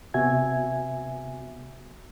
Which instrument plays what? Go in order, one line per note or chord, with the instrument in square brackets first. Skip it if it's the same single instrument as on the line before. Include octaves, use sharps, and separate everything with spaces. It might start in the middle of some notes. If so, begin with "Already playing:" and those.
[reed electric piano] C3 B3 F#4 E5 G#5 G#6